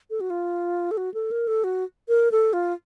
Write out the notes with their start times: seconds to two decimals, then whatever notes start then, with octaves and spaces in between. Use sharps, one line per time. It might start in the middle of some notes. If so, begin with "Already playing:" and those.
0.10 A4
0.21 F#4
0.30 F4
0.91 A4
0.97 F#4
1.14 A4
1.31 A#4
1.47 A4
1.64 F#4
2.09 A#4
2.32 A4
2.53 F4